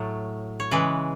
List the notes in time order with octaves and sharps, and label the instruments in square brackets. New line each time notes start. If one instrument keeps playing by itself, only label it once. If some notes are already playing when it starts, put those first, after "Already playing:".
Already playing: [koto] A2 F#3 A3
C#5
C#3 E3 G#3 B4